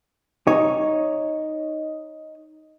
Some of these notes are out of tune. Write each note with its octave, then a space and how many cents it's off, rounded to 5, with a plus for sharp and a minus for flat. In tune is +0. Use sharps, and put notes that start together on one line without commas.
D#4 +0 C#5 +0